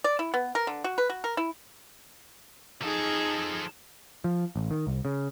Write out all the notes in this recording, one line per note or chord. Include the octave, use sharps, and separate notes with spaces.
D5
E4
B3
A#4
D3
F#4
B4
F#4
A#4
E4
F3 D#4 G#4 A4
F3
A1
D#3
C2
C#3